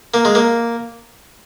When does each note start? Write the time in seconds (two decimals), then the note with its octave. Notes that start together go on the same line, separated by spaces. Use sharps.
0.14 A#3
0.25 G#3
0.35 A#3